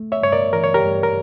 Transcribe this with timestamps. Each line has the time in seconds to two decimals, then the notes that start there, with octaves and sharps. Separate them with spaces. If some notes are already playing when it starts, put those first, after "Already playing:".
Already playing: A3
0.12 C#5 E5
0.22 G2 C#5
0.32 A#4 D5
0.53 E3 A#4
0.64 C#5
0.74 G4 A#4
0.84 G2
1.03 A#4